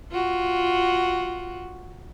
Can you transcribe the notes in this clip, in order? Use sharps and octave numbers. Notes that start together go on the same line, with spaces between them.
F4 F#4